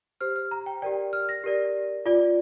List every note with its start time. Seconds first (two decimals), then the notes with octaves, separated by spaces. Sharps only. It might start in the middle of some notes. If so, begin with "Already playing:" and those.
0.21 G4 C5 F6
0.36 F6
0.51 A#5
0.66 G5
0.82 G4 A#4 D5 G5
1.13 F6
1.29 A#6
1.44 G4 A#4 D5
2.06 F4 D5